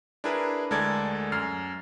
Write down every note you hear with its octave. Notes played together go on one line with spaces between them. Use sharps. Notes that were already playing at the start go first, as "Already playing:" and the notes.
D4 E4 G#4 A#4 B4
D2 G#3 A4 A#4 D5 G#6
F#2 F6 C7